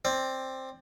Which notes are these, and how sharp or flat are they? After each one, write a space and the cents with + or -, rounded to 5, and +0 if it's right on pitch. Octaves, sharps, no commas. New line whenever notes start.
C4 +10 D5 +20